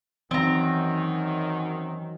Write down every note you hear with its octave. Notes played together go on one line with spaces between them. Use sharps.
F#2 D#3 E3 C4 A#5